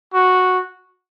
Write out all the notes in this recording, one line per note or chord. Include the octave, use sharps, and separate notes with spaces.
F#4